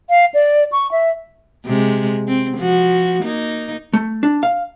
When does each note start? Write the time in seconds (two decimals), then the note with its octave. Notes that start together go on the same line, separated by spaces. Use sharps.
0.10 F5
0.34 D5
0.72 C#6
0.92 E5
1.66 C3 G#3
2.28 C4
2.57 F3 F#4
3.23 A#3 D#4
3.93 A3
4.23 D4
4.43 F5